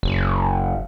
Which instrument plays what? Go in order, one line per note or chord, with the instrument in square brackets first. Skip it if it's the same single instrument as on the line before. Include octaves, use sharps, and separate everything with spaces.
[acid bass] F#1